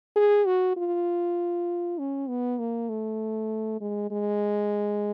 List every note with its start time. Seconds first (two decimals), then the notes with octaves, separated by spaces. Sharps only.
0.16 G#4
0.46 F#4
0.77 F4
1.98 C#4
2.29 B3
2.59 A#3
2.89 A3
3.80 G#3
4.11 G#3